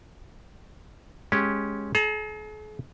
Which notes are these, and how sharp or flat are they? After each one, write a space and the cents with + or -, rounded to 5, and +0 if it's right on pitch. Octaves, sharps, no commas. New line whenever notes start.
G#3 +5 C#4 +0 G4 +0
G#4 +45 A#5 -15